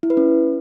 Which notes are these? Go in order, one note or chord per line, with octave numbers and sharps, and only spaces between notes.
E4
B4
C#4